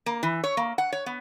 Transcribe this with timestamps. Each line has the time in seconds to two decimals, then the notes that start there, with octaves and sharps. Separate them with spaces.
0.06 A#3
0.23 E3
0.44 C#5
0.57 A#3
0.78 F#5
0.92 C#5
1.06 B3